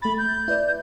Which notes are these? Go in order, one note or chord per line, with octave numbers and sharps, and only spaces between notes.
A3 B5 A6
G6
E4 B4 D5